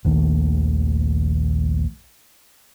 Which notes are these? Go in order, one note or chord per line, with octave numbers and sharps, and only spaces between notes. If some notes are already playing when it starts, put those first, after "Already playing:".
A#1 D#2 D#3 A3